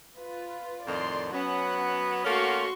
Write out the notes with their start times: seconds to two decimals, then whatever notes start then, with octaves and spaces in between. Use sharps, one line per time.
0.18 F4 B4
0.86 F2 A2 D#3 D5 C6
1.33 F#3 B3 C#4 F#5
2.25 A3 A#3 C#4 F#4 C6 C#6